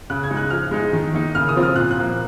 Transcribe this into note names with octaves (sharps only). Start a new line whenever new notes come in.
C#3 F#6
G#6
G#3 D#4
F#6
F3 F6
G#3 D#4
D#3
A#3 D#4
C#3 F6
D#6
F3 C4 F4
F6
A#2 F#6
F#6
F3 A#3